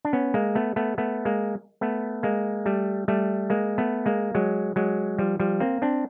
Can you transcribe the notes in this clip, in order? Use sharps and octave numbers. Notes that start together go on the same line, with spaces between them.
D4
B3 C#4
G#3 A#3
A3 B3
A3 B3
A3 B3
G#3 A#3
A3 B3
G#3 A#3
G3 A3
G3 A3
G#3 A#3
A3 B3
G#3 A#3
F#3 G#3
F#3 G#3
F3 G3
F3 G3
A#3 C4
C4 D4